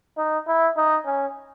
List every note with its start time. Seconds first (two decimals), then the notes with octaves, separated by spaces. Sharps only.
0.17 D#4
0.47 E4
0.77 D#4
1.06 C#4